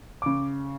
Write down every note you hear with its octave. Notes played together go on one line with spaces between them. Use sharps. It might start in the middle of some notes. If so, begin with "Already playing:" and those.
C#3 D6